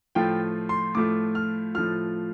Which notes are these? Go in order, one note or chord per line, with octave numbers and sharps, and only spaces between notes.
A2 F3 A3 F4 G5
C6
A2 F3 A3 F4 D6
F6
A2 F3 A3 F4 F6